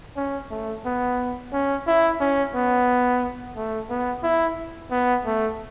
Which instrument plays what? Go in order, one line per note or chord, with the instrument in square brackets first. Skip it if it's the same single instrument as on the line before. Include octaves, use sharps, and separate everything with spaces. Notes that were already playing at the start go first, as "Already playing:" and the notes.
[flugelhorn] C#4
A3
B3
C#4
E4
C#4
B3
A3
B3
E4
B3
A3